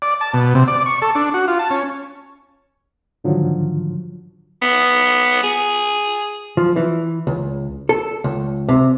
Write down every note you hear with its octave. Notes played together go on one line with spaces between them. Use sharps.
D5
A5
B2
C3
D5
C#6
A4
D4
F#4
F4
A5
C#4
G#2 D3 D#3 F3 F#3
B3
G#4
F3
E3
C#2
A4
C#2
C3